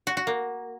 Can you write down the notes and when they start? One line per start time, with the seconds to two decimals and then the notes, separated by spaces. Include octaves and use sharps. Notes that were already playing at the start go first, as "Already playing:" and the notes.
0.07 F#4
0.17 F#4
0.27 A#3